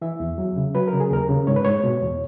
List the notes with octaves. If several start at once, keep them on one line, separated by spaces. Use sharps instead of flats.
E3 E5
E2
F#3
C#3
F#3 B4
A#4
C#3
G#4
D#2 A#4
C#3
G#2 C#5
B4
G#2 C#5
B2
E2